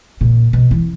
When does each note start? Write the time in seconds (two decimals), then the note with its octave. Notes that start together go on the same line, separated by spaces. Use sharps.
0.21 A#2
0.53 B2
0.71 E3